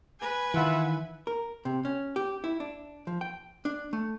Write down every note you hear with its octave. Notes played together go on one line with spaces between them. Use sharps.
B4 G#5
D#3 E3 F4 E5 F#5
A#4
C3
C#4
G4
E4
D4
F3
G5
D4
A3